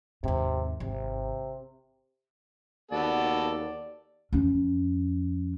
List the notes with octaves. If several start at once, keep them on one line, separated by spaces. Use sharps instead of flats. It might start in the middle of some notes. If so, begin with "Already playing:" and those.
D#2 G#2 C3
G#1 C3
D#2 B3 F#4 A4 D5
F2 C#4